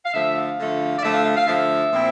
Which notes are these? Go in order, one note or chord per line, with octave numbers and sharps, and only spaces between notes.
F5
D3 F3 A3 E5
F5
D3 F3 A3
D5
D3 F3 A3 E5
F5
E5
F5
D3 F3 A3 E5
A#2 F3 C4 E4